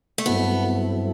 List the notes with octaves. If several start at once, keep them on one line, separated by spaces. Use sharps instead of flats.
A3
G2 F#3 B3 C4 E4 A4